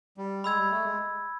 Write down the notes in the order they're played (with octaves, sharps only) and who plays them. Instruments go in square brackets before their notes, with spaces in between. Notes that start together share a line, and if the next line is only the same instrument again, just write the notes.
[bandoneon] G3
[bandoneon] G#3 [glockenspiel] B5 E6 G#6
[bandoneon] G3
A3
G#3